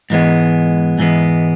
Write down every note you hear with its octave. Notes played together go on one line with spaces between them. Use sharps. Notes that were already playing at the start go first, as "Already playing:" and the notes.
G#2 E3 G#3 B3
G#2 E3 G#3 B3